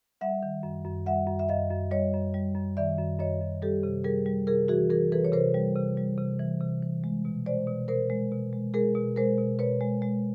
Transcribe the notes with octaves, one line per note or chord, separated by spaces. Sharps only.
G3 E5 F#5
D#3
F#2
F#2
G3 E5 F#5
F#2
E5
F#2 D#5 F5
F#2
G3 C#5 D#5
F#2
G3
F#2
D#3 D5 E5
F#2
F#2 C#5 D#5
F#2
G3 G4 A4
C3
G3 G#4 A#4
G3
C3 G#4 A#4
E3 F#4 G#4
E3 G#4 A#4
E3 A4 B4
C#5
C3 A#4 C5
G3
C3
G3
C3
E3
C3
E3
G#3
B2
G#3 C5 D5
B2
B2 A#4 C5
G#3
B2
G#3
G#3 G#4 A#4
B2
G#3 A#4 C5
B2
B2 B4 C#5
G#3
G#3